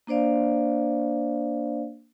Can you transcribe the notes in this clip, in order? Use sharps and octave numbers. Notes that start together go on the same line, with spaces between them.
A#3 D4 C5 D5 F5